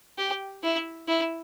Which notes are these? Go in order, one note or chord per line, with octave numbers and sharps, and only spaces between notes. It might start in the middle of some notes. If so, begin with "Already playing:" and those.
G4
E4
E4